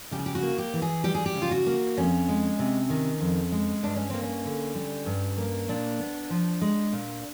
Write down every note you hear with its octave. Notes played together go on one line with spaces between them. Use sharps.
C#3 G4
G#4
G4
F#4
A#3
G4
E3
G#4
G3 G4
G#4
G4
C#3
F4
F#4
A#3
F2 C#4
G#3
C3
D#3
F2
G#3
G2 D4
C#4
A#3 C4
C#4
D3
G3
G2
A#3
A#2 D4
B3
F3
G#3
A#2